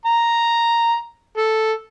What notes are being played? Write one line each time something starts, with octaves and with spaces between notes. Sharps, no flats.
A#5
A4